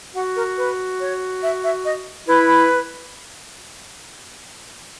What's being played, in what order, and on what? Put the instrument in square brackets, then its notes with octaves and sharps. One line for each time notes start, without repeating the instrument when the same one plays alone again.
[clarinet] F#4 [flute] F#5
[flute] A#4
B4
C#5
E5
E5
D#5
[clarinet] E4 [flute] B4